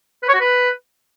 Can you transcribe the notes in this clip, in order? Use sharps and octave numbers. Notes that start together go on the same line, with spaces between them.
B4
C#5
F#4
B4